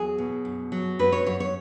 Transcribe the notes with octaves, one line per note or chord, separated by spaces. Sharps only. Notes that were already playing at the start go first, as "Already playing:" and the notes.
Already playing: E2 F#3 G#4
B2
F#2
F#3
F#2 B4
C#5
F#2 C#5
C#5